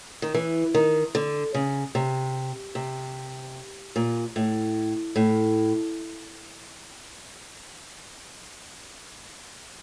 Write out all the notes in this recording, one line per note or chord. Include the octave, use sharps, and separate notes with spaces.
D#3
E3
D#3
D3
C#3
C3
C3
A#2
A2
A2